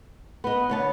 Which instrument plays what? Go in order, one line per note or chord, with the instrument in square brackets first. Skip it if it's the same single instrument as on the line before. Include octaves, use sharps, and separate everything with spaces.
[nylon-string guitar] B3 D#5 [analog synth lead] B4
[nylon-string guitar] D2 C#5 A5